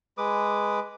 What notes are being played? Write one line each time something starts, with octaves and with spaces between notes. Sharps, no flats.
G#3 B4 D6 D#6